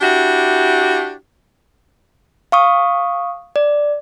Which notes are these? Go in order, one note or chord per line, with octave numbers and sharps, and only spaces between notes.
D4 E4 F#4 G4
F5 C#6 D#6
D5